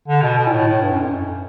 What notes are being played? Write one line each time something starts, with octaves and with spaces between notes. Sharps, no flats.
D3
B2
B2
A#2
A2
A2
G2
F#2
F2
F#2